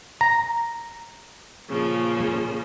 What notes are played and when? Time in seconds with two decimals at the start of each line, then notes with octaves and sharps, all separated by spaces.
0.21 A#5
1.69 A#2 C#3 F3